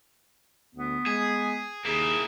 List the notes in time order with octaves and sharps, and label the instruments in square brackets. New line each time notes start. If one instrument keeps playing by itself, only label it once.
[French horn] D2 [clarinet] B3
[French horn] G#3 [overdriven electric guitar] G#4
[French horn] D#2 [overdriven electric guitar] A#3 E4 [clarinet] G#4